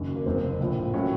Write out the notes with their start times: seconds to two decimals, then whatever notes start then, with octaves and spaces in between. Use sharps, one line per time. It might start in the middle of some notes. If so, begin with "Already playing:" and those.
Already playing: F#1 F#2 D#3 F#3
0.15 A#3
0.26 F#1 F2 C3 C4
0.60 A#1 A2 F3
0.94 A2 F#3 C#4